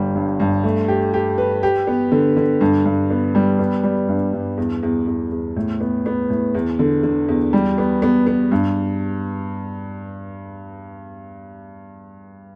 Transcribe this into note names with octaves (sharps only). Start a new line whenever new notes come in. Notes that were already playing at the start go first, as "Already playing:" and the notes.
Already playing: G1 G3
G2
G2
A3
G4
G4
B4
G4
B3
D3
D3
G2
G2
B3
G3
B3
G3
G2
G2
E2
E2
E2
E2
A2
B3
B3
A2
E2
D3
D3
E2
G3
B3
B3
B3
G2